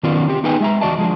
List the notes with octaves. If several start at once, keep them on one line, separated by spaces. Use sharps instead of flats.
D#3 F#3 B3 C#4 F4 D5
C4 G4
B3 D#4 G#4 B4 G5 G#5
G#3 E5 A#5
E2 B3 F#4 D5 D#5 A5
F3 G#3 D4